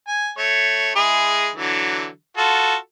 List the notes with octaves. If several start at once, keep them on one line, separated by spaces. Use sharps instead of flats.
G#5
A3 C#5
G#3 E4 G#4
D3 E3 F#3
F4 F#4 A4